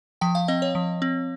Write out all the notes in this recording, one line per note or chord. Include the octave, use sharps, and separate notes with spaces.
F3 G5
F5
C4 D#5
C#5
F3
C4